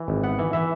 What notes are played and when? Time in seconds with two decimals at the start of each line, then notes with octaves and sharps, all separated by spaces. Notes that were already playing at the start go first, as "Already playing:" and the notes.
Already playing: E3
0.08 G#1
0.24 B3 F#5
0.39 E3
0.53 E3 E5